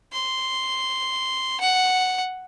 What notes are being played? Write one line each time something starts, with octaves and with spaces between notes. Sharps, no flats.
C6
F#5